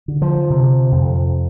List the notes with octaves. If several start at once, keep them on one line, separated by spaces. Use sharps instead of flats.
D3
F3
C3
F2